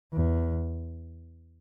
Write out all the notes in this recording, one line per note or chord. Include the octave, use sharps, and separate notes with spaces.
E2